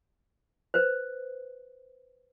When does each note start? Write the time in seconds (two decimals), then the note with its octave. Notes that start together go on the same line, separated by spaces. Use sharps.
0.74 B4 C5